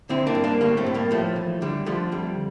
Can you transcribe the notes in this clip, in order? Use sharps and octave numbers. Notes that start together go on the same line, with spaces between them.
D3 C4 E4
A#3 D4
G2
A#3 D4
A2 G3 A#3
A3 C4
A2
G3 A#3
A2 F3 A3
E3
D3 G3
D3 F3 A3
F2 G3